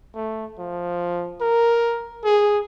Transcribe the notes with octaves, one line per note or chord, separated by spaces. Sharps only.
A3
F3
A#4
G#4